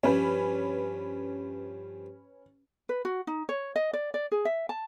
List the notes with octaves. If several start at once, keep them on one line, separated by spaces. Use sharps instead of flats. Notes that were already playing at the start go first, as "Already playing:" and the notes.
G2 F3 C#4 D4 B4
B4
F#4
D#4
C#5
D#5
D5
D5
G#4
E5
A5